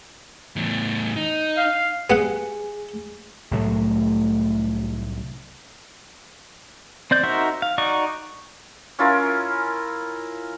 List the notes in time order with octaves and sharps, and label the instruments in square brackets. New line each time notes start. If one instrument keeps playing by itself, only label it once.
[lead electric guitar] E2 A2
D#4
[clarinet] F5
[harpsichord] B3 F#5 [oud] G#4
[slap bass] C2 A2 F#3 A3
[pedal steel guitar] C4 D5 G6
D#4 F#4 A#4 C5 E5
F5
D#4 F#4 D5 C#6
[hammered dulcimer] C#4 E4 F4 A#4